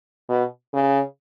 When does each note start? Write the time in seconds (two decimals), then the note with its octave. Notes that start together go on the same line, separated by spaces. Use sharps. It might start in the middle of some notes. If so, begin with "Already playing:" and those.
0.30 B2
0.73 C#3